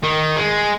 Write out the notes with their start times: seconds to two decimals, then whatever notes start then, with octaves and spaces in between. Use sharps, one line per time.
0.03 D#3
0.37 G#3